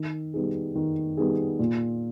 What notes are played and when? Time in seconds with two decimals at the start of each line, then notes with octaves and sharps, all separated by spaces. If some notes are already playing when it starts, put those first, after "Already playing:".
Already playing: D#3
0.34 G3 B3 D#4 G#4
0.75 D#3
1.17 G3 B3 D#4 G#4
1.59 A#2